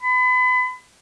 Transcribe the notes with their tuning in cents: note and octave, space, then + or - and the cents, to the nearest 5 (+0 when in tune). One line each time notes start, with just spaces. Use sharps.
B5 +35